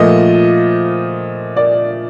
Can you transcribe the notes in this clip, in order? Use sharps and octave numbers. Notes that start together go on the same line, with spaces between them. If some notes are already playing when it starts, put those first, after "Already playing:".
Already playing: A#2 F3 A3 D#5
D5